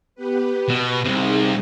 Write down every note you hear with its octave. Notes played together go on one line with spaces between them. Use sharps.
B3 G4 B4
B2 B4 A#6
C2 C3 D#4 G#4